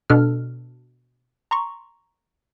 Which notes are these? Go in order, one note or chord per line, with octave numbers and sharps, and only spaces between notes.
B2 D4 A4 F6
A#5 C6 C#6